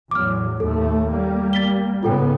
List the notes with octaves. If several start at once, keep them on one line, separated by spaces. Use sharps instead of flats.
E2 A2 F#3 D6 F6
D#2 A2 A3 A4
G3 A#3
A6 B6 G7
G#2 C#3 B3 F4 A4 G5